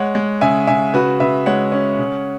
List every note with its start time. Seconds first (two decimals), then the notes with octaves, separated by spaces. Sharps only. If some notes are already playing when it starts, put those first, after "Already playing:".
Already playing: G#3 C#5 F#5
0.15 G#3
0.41 C#3 E5 G#5
0.67 C#3 E5 G#5
0.94 C#3 F#4 B4
1.20 C#3 B4 E5
1.46 G#3 C#5 F#5
1.72 C#4
1.99 C#3